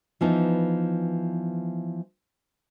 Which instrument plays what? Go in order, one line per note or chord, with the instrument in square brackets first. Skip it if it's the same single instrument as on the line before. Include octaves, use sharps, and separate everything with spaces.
[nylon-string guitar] E3 F3 B3 D#4